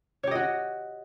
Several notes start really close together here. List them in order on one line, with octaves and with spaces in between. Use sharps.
C#5 G4 D#5 F#4